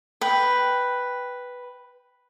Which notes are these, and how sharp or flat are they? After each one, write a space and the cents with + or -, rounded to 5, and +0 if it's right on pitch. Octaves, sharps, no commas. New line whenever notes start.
B4 +0 G5 +0